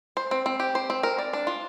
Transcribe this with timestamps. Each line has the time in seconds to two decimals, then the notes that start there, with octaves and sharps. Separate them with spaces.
0.17 C5
0.31 C4
0.46 C4
0.60 G4
0.75 C5
0.90 C4
1.03 A#4
1.18 D5
1.33 D4
1.47 F4